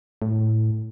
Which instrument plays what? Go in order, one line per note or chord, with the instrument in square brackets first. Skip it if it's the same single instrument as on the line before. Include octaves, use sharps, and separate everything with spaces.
[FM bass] A2